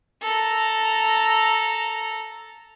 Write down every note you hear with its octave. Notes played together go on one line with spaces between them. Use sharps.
A4 A#5